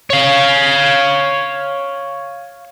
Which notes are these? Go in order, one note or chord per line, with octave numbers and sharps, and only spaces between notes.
C#5 F5